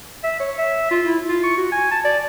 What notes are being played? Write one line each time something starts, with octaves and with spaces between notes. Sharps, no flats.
E5
C#5
E5
F4
E4
F4
C#6
F#4
G#5
A5
D5